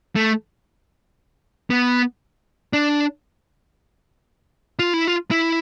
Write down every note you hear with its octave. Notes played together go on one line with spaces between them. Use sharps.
A3
B3
D4
F4
E4
F4
E4